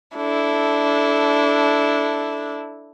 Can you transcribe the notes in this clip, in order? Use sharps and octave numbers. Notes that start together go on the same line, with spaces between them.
D4 E4 A4